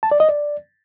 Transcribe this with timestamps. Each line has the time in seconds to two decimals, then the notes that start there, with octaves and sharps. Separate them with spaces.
0.03 A5
0.11 D5
0.20 D#5
0.29 D5